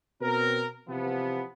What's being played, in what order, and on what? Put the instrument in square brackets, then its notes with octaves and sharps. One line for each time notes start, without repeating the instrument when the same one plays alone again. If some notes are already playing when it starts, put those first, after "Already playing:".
[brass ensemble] B2 C4 A#4
C3 E3 F3 B3